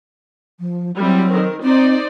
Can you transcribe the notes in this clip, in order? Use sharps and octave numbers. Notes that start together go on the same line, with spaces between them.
F3
F#3 G3 C4 E4
D#3 A#4
C4 D#4 C5 D5